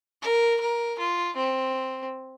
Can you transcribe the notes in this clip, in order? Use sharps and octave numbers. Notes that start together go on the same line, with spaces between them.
A#4
A#4
F4
C4